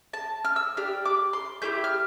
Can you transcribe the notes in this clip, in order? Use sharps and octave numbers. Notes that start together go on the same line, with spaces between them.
A5
F6
E6
D4 G4 F6
D6
C6
A3 E4 G4 G6
F6